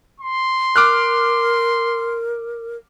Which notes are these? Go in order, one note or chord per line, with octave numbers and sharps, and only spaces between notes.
C6
A#4 D6 F6 F#6